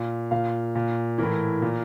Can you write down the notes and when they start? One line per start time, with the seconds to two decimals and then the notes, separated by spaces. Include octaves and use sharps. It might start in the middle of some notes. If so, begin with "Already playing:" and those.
Already playing: A#2 F5
0.31 A#2 F5
0.75 A#2
1.18 A2 E3 A#4
1.62 A#2